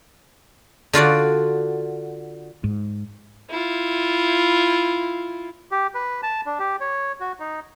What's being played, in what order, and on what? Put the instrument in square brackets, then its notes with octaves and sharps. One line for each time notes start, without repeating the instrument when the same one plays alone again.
[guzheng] D3 F4 F#4 D5
[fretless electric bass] G#2
[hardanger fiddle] E4 F4
[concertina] G4
B4
A5
D4
G4
C#5
F#4
D#4